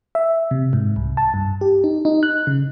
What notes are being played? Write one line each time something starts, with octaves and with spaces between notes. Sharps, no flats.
E5
C3
G#2
C2
A5
G2
G4
D#4
D#4
F#6
C#3